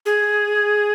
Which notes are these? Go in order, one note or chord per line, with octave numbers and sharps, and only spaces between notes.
G#4